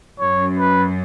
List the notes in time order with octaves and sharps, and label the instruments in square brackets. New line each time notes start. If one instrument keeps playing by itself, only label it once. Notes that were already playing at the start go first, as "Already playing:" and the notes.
[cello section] F#2 [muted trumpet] C#5
[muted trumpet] B4